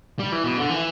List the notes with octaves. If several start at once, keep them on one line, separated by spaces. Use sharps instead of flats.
G3
E3
B2
D3
E3